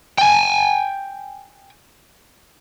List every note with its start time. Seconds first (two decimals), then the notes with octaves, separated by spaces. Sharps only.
0.18 G5 G#5